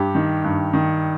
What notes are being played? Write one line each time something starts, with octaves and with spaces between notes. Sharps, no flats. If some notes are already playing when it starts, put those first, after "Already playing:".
Already playing: G2 G4
D#3
G2
D#3